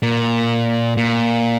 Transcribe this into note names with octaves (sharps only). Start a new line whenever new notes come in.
A#2
A#2